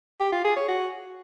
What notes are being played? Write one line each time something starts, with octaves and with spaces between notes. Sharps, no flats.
G4
F4
G#4
C#5
F#4